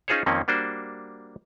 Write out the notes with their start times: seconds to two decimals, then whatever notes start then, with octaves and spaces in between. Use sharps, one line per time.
0.08 C#4 D#4 F4 G#4 C5 C#5
0.26 F2 D#3 F3 A#3 C4 C#4
0.48 G3 A#3 D4 F#4 C5